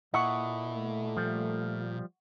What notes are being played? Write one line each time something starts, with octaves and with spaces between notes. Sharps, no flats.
A#2 E4 A4 D#5 F#5 C#6
A3
F3 G3